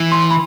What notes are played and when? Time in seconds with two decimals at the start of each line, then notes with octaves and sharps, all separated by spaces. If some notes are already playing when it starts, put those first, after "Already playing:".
Already playing: E3
0.12 C6
0.31 B5